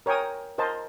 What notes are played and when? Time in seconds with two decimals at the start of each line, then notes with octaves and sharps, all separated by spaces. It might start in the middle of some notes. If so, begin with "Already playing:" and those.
0.06 A#4 C#5 G5 G#5 D#6
0.58 A#4 C5 D#5 A5